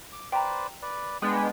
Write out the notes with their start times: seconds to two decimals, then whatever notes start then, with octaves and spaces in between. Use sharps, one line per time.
0.13 D6
0.32 B4 C5 D5 G5 A#5
0.82 B4 D5
1.22 G#3 B3 D4 G5